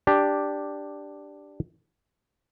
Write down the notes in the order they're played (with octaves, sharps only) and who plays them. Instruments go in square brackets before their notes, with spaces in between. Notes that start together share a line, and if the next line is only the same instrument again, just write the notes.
[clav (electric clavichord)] D4 G4